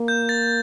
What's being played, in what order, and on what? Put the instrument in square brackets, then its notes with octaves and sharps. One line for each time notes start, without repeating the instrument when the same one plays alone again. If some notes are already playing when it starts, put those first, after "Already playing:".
Already playing: [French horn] A#3
[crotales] G6
A6